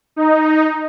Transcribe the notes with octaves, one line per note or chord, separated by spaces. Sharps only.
D#4